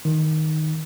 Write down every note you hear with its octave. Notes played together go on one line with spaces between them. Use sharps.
D#3